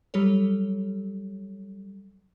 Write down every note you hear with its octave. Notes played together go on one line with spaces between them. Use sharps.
F#3 G3 G4 A4 C#5